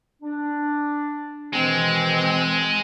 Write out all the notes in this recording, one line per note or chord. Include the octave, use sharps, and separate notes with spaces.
D4
B2 D#3 E3 G#3 C4